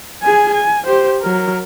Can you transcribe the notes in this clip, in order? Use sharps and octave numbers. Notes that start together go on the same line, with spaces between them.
G#4 G#5
G#5
G4 C5
F#3 A#4